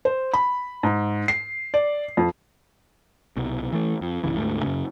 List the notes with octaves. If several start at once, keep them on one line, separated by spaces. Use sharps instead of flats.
C5
B5
G#2
C7
D5
F2
C2 B2
E3 A3
F2
G1 C2 C#3 E3
D2 G#2 A3
F#2 C#3